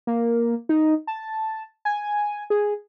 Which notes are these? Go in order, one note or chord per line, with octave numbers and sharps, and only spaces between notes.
A#3
D#4
A5
G#5
G#4